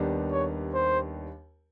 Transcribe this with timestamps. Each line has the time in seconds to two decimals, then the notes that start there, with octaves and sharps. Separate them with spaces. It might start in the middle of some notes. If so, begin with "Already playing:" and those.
Already playing: D#2 D#3 G3 B3 D4
0.31 C#5
0.74 C5